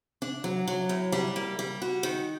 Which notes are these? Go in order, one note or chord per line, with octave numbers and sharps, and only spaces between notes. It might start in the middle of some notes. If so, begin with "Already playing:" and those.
D4
F#3
F#3
A2
G3
A#3
G3
F#4
D#3